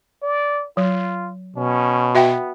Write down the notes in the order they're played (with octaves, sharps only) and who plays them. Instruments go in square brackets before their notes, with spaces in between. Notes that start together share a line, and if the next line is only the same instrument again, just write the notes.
[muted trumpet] D5
[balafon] F#3 [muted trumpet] F4
[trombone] B2 [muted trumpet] C#4
[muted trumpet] B3 [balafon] F#4 E5 G5